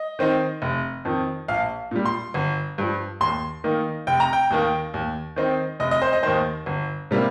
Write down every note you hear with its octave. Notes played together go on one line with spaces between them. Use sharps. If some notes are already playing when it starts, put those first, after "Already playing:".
Already playing: D#5
D#3 C4 D#4
F1
F2 D#3
A#1 F5
A#2 G3
C6
G1
G2 F3
D#2 C6
D#3 A#3 D#4
F1 G5
A#5
G5
D#2 D#3 A#3
D#2
D#3 C4 D#4
F1 D#5
D#5
C5
D#5
D#2 D#3 C5
G1
C3 G3 A#3